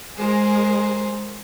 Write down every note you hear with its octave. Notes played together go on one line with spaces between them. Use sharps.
G#3 G#4 A#4 C5